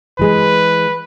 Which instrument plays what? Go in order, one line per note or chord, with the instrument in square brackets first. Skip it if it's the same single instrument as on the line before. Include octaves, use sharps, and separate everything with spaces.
[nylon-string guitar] E3 G#3 G#4 [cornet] B4